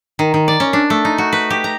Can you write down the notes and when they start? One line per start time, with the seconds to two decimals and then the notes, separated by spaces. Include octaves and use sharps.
0.19 D#3
0.34 D#3
0.48 D5
0.60 C#4
0.73 D4
0.90 A3
1.05 D#4
1.18 F#4
1.33 B4
1.50 G4
1.64 A#5